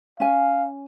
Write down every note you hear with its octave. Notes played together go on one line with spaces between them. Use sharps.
C#4 F5 G#5